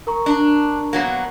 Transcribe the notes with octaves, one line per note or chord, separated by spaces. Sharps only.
A#4 A#5 C#6
D4
B2 F#3 A#3